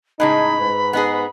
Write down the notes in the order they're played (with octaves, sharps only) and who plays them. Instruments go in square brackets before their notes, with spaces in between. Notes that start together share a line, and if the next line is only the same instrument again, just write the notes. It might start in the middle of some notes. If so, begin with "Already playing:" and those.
[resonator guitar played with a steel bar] A2 C#3 G#3 [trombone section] D#4 [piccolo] B5
[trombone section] G#2 B4
[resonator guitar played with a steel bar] B3 D#4 G#4